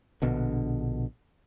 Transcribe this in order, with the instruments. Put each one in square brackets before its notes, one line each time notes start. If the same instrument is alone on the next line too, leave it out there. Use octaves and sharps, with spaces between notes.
[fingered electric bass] A#1 B2 D3